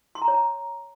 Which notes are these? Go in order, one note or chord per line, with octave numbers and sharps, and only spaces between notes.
C6
A#5
C#5
A#5